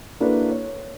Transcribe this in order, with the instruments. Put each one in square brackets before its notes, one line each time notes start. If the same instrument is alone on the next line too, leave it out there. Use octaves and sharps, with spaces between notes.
[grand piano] A#3 D4 E4 F#4 A4 B4
C#5